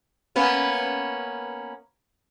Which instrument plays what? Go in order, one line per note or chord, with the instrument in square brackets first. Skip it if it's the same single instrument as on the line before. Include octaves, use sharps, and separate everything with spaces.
[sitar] A#3 B3 C#4